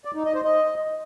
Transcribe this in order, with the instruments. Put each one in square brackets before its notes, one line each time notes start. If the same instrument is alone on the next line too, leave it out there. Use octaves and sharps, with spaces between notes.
[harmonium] D5
D#4
D#5
C5
D#5